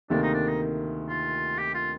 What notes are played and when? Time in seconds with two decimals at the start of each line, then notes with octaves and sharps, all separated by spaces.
0.10 D2 C3 D#3 A#3 D4
0.23 D#4
0.34 D4
0.47 D#4
1.09 F4
1.58 G4
1.74 F4